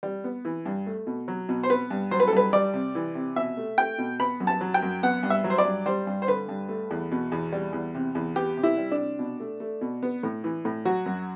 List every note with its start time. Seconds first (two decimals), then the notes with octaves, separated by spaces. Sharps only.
0.03 G3
0.24 B3
0.45 E3
0.66 G2
0.87 A3
1.07 B2
1.28 F#3
1.49 B2
1.63 C5
1.70 B3 B4
1.90 G2
2.11 F#3 C5
2.20 B4
2.28 A4
2.32 G2 B4
2.53 G3 D5
2.74 C3
2.95 E3
3.15 C3
3.36 B2 E5
3.57 A3
3.78 A3 G5
3.98 B2
4.19 B3 B5
4.40 F#2
4.47 A5
4.61 F#3
4.74 G5
4.83 F#2
5.03 B3 F#5
5.23 G2
5.30 E5
5.44 F#3
5.50 C5
5.58 D5
5.65 G2
5.86 G3 C5
6.07 G2
6.22 C5
6.28 D3 B4
6.48 G2
6.69 A3
6.91 E2
7.11 B2
7.32 E2
7.52 G3
7.73 E2
7.95 C3
8.15 E2
8.36 B3 G4
8.57 C3
8.63 E4
8.77 G3
8.92 D4
8.98 C3
9.19 B2
9.40 A3
9.60 A3
9.81 B2
10.03 B3
10.23 A2
10.44 E3
10.65 A2
10.85 F#3 F#4
11.06 F#2